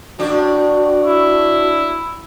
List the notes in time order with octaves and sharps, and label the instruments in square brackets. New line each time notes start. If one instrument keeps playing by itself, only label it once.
[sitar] A2 D4 [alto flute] F#4
[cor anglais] E4